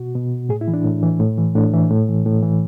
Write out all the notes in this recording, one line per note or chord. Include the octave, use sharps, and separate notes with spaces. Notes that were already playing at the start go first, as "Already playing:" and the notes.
Already playing: B2 F#4
B2
A2 G#4
E4
E3
D4
A2
E3
A2
E3
A2 D4
E3
A2
E3
A2
E3